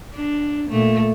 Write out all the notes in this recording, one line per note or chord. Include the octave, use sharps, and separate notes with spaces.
D4
A#2 A3